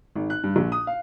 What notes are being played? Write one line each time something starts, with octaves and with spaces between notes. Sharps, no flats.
G#1
F#6
G2
A#1
D#6
F5